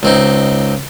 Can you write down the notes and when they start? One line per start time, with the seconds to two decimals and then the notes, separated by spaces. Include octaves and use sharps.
0.03 C#2 C4 D#4